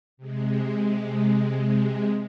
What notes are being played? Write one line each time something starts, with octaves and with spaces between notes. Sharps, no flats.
C3 G#3